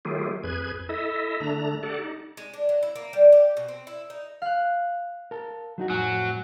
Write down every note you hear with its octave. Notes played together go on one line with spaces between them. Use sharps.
D#3 F#3 A3 F4 G4 G#4
F2 G#4 B4 G#6
E4 A4 D#5 E5
D3 A3 D4 A#5
G4 A4 D5 F#5
D#4
G#3
D4
F#3
E4
A#3
G3
G4
B2
C4
E4
D#4
F5 F#6
A#4 A5
F#3 D#4 F#4
F2 A2 F#3 G#5